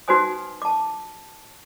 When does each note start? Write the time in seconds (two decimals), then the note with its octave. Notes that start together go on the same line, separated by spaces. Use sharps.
0.08 D#4 F#4 B4 C5 G#5 D#6
0.62 A5 D6